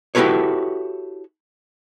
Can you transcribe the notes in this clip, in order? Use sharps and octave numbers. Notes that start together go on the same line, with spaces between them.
E4 F#4 G4 A4 B4 C#5